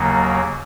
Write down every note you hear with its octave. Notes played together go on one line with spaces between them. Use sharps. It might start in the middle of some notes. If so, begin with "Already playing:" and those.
Already playing: D#2 C#3 F#3 A#3